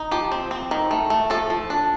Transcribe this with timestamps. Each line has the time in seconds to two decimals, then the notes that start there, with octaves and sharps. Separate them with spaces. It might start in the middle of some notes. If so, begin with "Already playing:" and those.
Already playing: D#4
0.11 F3 G4
0.32 C4
0.51 C4
0.71 D#3
0.91 A3
1.10 A3
1.30 F3 A4
1.50 F3
1.70 D4